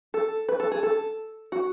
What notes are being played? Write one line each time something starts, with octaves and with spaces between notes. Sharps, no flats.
A4
B4
A4
G#4
A4
F#4